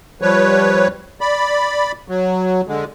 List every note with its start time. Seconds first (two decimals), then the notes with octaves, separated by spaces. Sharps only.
0.22 F3 G3 B4 C#5
1.21 D5 B5
2.08 F#3
2.68 D3 G#3